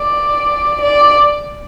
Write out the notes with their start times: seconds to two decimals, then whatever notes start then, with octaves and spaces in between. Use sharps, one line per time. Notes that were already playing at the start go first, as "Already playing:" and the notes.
Already playing: D5
0.81 D5